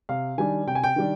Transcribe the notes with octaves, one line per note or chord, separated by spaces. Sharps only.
C3 F5
D#3 G3 D4 G#5
C3 G5
G#5
G5
D#3 G3 D4